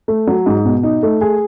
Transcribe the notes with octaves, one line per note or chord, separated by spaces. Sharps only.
A3
F#3
G#2
B2
D#4
A3
G#4